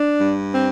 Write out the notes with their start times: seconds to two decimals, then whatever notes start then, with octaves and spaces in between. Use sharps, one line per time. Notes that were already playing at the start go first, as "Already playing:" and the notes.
Already playing: D4
0.20 G2
0.53 C4